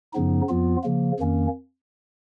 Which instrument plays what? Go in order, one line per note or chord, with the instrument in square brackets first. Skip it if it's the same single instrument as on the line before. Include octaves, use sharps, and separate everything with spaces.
[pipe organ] F#2 C#3 F3 B3 D#4
F2 F3 B3 F4
C#3 F3 A#3
F2 D#3 A#3 C#4